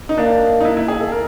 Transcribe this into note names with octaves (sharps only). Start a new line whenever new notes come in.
D#4
A#3 D4
D#4
E4
E4
G#4
A4
A#4